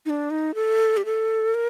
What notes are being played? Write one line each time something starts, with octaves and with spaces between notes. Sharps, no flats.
D#4
D4
D#4
A4
G4
A4
A#4